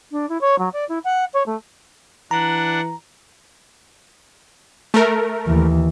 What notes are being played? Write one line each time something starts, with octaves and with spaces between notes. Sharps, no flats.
D4
E4
C#5
F#3
D5
E4
F#5
C#5
A3
E3 D4 F#5 A#5
A3 A#4
D#2 E3